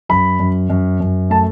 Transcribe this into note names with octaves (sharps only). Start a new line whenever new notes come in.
F#2 B5
F#2
F#2
F#2
A3 A5